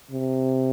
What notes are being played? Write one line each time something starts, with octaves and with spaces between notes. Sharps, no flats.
C3